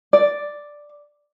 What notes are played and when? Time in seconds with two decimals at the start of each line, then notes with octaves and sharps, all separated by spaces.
0.13 D5